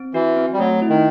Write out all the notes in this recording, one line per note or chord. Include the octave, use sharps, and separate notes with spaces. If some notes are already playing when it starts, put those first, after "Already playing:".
Already playing: C4
E3 F#4
C4
G3
F#3 A3
E4
D#3